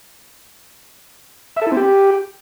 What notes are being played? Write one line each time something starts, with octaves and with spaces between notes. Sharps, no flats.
E5
A4
E4
C4
G4